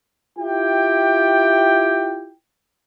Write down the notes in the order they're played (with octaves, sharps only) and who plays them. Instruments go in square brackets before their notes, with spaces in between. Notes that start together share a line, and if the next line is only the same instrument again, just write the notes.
[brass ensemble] E4 F4 G4 G5